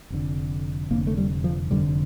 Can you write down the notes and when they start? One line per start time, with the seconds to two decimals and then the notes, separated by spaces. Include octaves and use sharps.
0.10 F1 F2 D3
0.90 F1 F2 D3 A#3
1.07 A3
1.18 G3
1.44 F3
1.71 F1 F2 D3 G3